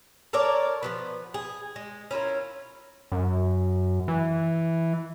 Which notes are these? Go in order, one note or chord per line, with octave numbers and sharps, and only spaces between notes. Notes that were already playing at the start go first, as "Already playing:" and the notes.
A4 A#4 C#5 D5
F3 F#3 B3
G#4
G#3
C#4 E4 F4 A#4
F#2
E3